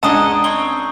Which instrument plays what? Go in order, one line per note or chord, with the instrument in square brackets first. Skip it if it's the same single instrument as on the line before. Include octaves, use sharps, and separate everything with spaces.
[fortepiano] C#2 D4 [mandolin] G#4 D#5 F#5 [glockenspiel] A5 A#5 D#6
[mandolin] C4 C#5 [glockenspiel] G7